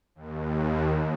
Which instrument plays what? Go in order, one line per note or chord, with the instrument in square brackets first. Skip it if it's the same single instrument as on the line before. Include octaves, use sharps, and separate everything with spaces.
[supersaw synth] D#2